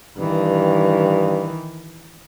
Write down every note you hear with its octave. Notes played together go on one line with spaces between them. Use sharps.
G2 D#3 E3